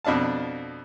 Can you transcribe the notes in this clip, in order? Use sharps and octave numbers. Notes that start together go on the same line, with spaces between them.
F2 B2 D4 F5 A5